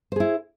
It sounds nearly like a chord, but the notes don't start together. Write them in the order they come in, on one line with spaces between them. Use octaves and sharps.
C5 G#4 E4